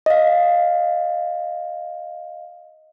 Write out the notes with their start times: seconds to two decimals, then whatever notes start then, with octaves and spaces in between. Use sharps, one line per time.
0.06 D#5 F5